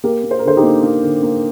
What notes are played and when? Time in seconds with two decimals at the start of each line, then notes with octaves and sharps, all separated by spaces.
0.04 A#3 G4 A#4
0.24 A#3
0.31 C5
0.39 A#4
0.44 D3 A4 C5
0.57 D#4 G4
0.63 A#3
0.83 A#3
1.03 D3
1.23 A#3